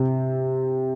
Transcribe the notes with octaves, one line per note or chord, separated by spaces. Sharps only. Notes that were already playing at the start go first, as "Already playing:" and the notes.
Already playing: C3 C4